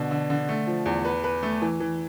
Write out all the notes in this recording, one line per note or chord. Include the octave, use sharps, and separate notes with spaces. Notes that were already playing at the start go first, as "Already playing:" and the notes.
Already playing: B2 D3
D3
D3
A3
F3
E2
B4
B4
A3
E3
E3